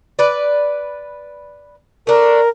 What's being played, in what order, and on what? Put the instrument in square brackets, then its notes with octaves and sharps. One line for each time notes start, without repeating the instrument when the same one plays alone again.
[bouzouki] B4 D5
[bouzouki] A3 D4 [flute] A#4